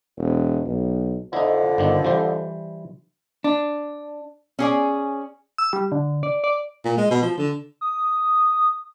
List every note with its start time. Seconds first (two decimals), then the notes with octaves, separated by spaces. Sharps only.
0.17 E1
0.65 B1
1.33 F2 D3 D#4 E4
1.78 G1 D#3 D4
2.05 E3 G3 C5
3.44 D4
4.59 C#4 G#4 D5
5.58 E6
5.73 G3
5.92 D3
6.23 D5
6.44 D5
6.85 A#2
6.98 G#3
7.11 B2
7.22 F3
7.38 D3
7.81 D#6